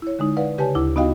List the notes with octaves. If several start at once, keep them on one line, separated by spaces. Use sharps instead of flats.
E4 C#5
D3 G#3 D#4
B4 D5 F5 F#5
C#3 G4 B4 C#5 G#5 A5
D2 E4 D6
B3 D#4 F#4 D#5 F5 G5